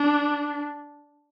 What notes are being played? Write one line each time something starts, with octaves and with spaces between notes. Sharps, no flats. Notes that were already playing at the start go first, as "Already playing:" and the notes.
Already playing: D4